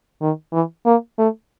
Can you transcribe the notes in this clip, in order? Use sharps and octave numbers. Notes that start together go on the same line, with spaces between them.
D#3
E3
A#3
A3